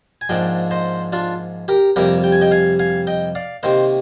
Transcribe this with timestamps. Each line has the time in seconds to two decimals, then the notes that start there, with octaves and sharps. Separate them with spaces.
0.21 G#5
0.29 G#2 F3 A#3 D4 D#5 G5
0.71 C5 D#5
1.12 D4 F4
1.68 G4 A#4
1.96 F2 C3 G3 A#3 G4 A#4
2.24 G5
2.32 G#5
2.41 D#5 G5
2.51 F5 G#5
2.79 F5 G#5
3.07 D#5 G5
3.35 D5 F5
3.63 C3 D#3 A#3 C5 D#5